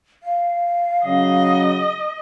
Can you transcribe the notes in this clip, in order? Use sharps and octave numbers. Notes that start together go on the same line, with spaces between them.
F5
C#3 F#3 D#5